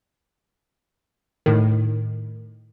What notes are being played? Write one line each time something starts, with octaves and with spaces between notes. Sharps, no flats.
A2 D#3